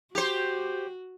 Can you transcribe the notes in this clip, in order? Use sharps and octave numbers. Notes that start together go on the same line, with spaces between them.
F#4 G4 C5